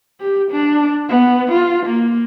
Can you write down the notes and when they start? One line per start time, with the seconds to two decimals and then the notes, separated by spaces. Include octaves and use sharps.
0.20 G4
0.51 D4
1.09 B3
1.52 F4
1.86 A#3